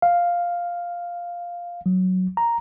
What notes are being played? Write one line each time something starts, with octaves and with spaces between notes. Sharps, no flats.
F5
F#3
A#5